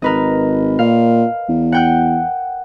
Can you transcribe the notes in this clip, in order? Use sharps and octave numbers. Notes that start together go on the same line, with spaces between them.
G#1 A#4 B4 D#5
A#2 F5
E2
F#5 G5 F#6